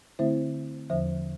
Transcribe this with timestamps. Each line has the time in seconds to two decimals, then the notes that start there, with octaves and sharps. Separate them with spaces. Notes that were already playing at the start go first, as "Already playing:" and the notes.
0.19 D3 A3 C4 E4 C5 E5
0.90 E2 D3 F3 C5 E5